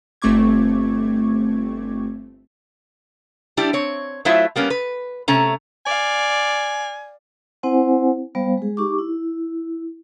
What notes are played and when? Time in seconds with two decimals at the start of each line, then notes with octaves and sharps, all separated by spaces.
0.22 G1 A3 C4 C#6 D6 G#6
3.57 G3 D4 E4 G4
3.73 C4 C#5
4.25 F#3 A3 E4 F4 C5 E5
4.56 G3 A#3 B3 C#4
4.70 B4
5.28 C3 A3 C#4 A#5
5.86 D5 F5 G#5
7.63 C4 E4 C5 F#5 G#5
8.35 G3 B3 C5 F5
8.57 G#3 G#4
8.77 D#4 G4 C#6 D6
8.99 E4